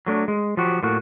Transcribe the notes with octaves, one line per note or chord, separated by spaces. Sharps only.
F#3 A3 D4
G#3
F3 F#3 F#4 G4
A2 A#3 F#4